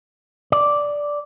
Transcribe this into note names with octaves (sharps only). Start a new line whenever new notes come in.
D5